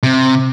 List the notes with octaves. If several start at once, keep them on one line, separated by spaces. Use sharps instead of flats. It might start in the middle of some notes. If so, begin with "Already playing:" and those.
C3